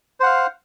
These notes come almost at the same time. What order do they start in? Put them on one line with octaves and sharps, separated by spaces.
C5 F#5 F5